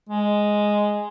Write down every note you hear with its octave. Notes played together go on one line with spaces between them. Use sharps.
G#3